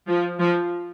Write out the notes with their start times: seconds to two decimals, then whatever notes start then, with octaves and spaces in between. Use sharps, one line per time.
0.08 F3
0.40 F3